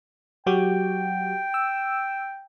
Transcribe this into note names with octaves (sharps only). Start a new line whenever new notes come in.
F#3 F#4 G4 G5
E6